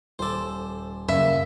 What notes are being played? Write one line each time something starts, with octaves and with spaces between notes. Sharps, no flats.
D#1 A4 C5 D6
F#2 A#2 C#3 E4 E5 C#6